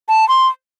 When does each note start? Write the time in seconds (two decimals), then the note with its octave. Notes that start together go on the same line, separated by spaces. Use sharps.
0.09 A5
0.29 C6